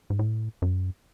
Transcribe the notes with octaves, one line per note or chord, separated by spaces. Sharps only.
G#2
A2
F#2